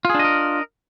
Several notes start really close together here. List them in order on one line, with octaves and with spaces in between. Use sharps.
F4 G#4 D4 D#5 A#4